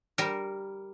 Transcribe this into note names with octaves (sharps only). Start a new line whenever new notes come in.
G3 A#4